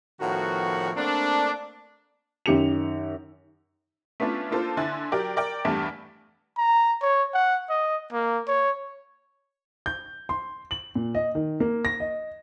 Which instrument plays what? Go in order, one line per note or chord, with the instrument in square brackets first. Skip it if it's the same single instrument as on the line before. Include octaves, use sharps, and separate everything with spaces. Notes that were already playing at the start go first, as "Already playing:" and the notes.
[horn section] A2 D#3 F3 B3 F#4
A3 A#3 C4 D4
[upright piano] F#2 D#3 G4 C#7 F7
[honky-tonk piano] A3 B3 C#4 D4 F4
A#3 D4 F4 A4 C5
D3 E4 G#5 C6 F#6 A6
F#3 G4 A#4 D5
A#4 D5 G5
E2 G2 G3 A3 D4
[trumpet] A#5
C#5
F#5
D#5
A#3
C#5
[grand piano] G6
C6
F#7
A#2
D#5
D#3
A#3
A#6
D#5